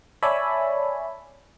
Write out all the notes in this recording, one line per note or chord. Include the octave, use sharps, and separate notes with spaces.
C#5 D5 E5 G#5 A5 B5